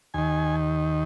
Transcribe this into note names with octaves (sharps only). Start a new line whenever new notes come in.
D#2 D#3 G#5